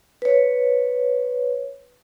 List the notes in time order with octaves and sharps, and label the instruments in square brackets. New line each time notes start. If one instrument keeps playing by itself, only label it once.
[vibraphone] B4 C#5